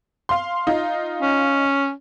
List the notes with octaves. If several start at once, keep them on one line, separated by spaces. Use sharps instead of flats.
F5 C6
D#4 F4
C#4